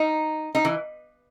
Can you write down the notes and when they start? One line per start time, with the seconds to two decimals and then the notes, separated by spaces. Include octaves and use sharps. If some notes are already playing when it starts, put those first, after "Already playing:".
Already playing: D#4
0.55 D#4
0.65 E3